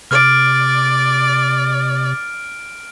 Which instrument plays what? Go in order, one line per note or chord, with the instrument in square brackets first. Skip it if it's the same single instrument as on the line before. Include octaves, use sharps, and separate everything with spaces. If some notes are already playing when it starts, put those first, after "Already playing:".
[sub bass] C3 [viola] D5 [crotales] F6 D7